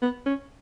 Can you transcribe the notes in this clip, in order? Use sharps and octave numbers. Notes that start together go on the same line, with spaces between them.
B3
C#4